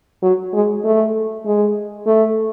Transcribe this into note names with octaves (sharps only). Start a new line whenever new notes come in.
F#3
G#3
A3
G#3
A3